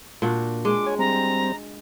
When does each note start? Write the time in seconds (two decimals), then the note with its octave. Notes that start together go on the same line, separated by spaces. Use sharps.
0.22 A#2 D4 F#4
0.65 G#3 D6
0.86 C#5 G#5
0.99 G3 C4 A#5